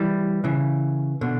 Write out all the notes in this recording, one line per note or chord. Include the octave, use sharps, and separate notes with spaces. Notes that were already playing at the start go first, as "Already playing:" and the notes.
Already playing: E3 G3
C#3 E3
B2 D3